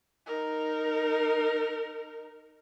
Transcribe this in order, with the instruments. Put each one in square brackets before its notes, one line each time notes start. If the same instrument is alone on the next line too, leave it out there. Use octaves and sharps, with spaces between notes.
[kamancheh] D#4 A#4